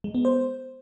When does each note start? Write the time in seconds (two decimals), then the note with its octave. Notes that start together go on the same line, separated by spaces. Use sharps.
0.04 G#3
0.15 B3
0.25 C5